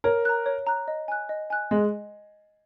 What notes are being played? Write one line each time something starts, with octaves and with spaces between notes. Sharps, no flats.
A#4 C#5
A#5 F#6
C#5
A#5 F#6
D#5
G#5 F#6
D#5
G#5 F#6
G#3 D#5